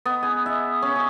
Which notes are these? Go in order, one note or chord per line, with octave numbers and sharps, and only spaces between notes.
B3
G#4
E5
C#4
G#4